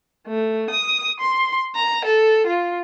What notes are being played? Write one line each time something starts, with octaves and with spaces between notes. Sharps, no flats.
A3
D#6
C6
A#5
A4
F4